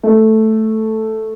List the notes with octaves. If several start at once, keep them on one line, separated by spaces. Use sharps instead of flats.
A3